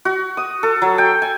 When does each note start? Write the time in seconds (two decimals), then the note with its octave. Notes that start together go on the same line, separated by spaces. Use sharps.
0.05 F#4
0.37 D#6
0.63 A4
0.82 F#3
0.98 G5
1.22 G#5